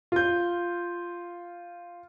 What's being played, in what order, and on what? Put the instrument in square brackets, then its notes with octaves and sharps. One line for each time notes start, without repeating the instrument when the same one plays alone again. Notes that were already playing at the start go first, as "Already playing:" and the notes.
[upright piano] F4 G6